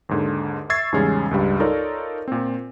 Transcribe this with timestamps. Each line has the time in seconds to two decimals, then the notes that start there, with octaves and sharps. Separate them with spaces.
0.09 D#2 G#2 D3
0.70 E5 C#6 E6 G#6 A6 C7
0.92 E2 G#2 C#3 G3 G#3 C#4
1.31 C#2 G2 G3
1.60 D#4 F4 A4 A#4 C#5 D5
2.28 A#2 C4